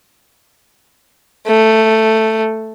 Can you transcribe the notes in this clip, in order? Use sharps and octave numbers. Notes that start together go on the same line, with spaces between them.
A3